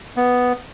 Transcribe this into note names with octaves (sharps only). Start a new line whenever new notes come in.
B3